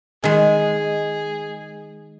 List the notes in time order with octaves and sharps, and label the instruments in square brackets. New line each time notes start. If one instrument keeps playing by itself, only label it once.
[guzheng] D#3 G#3 [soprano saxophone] G#4